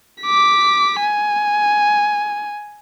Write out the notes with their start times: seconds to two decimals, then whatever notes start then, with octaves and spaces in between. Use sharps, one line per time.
0.23 D6 B6
1.00 G#5